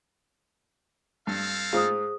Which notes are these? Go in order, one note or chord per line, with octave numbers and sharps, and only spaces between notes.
G2 C4 A4 F5
G#2 F4 G#4 C5 D#6